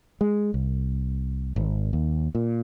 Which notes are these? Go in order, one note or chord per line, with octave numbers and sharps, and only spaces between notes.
G#3
C2
G#1
D#2
A#2